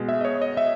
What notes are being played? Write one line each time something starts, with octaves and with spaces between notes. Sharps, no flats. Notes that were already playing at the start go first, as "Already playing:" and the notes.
Already playing: B2 G#3
E5
D#5
C#5
D#5
E5